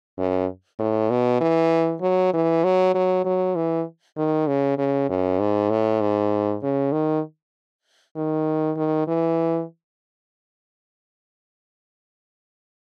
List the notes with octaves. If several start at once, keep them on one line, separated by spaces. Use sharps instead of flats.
F#2
A2
B2
E3
F#3
E3
F#3
F#3
F#3
E3
D#3
C#3
C#3
F#2
G#2
A2
G#2
C#3
D#3
D#3
D#3
E3